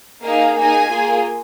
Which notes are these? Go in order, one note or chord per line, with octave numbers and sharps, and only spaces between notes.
A#3 D#4 G#4 F5
A#3 D#4 G#4 G#5
A#3 F4 G#4